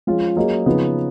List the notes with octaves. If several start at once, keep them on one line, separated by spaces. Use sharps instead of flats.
F3 G#3 C#4 F4
F#3 A#3 C#4 G#4 D#5
C#3 F3 B3 D#4